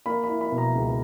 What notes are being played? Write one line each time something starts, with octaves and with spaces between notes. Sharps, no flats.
A#3 B5
B5
E4
B5
B2
A#5
C#2